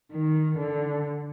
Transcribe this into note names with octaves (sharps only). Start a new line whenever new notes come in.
D#3
D3